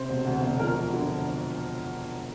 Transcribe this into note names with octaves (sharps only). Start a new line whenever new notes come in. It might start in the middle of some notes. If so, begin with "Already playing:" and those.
Already playing: C3 C5
E1
D2
E1
F3 A#4
F2
D3